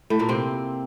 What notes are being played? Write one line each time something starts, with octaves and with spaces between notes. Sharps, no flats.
A2 A3
A#2 A#3
C3 C4